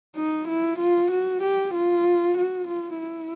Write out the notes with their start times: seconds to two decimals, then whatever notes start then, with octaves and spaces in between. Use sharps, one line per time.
0.16 D#4
0.48 E4
0.79 F4
1.11 F#4
1.42 G4
1.74 F4
2.37 F#4
2.68 F4
3.00 E4